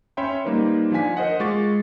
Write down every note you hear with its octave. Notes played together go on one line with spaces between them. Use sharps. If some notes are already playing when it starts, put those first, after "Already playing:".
C#4 C#5 E5 G5 B5 C6
G3 A#3 D#4 B4 C5
F3 D4 F5 G#5 B6
A#4 C5 D#5 F#5
G#3 F4 C#6 D6 A6